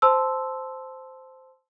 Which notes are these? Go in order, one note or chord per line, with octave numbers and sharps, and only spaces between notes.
C5 A5 C6 E6